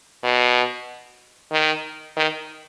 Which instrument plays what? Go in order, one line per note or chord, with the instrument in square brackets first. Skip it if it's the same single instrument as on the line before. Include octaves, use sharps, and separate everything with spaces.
[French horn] B2
D#3
D#3